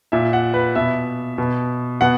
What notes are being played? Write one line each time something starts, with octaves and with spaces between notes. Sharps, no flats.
A#2 E5
F#5
B4
B2 E5
B2
B2 F#5